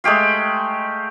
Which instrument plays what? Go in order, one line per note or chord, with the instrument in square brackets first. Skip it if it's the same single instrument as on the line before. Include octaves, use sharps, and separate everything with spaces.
[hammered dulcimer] G#3 A3 G4 F5